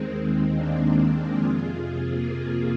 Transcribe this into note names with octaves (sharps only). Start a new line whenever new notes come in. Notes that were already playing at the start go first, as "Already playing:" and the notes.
Already playing: D#2 D#3 G#3 C4
A#3 D4
F2 C3 F3 F4 G#4
A#3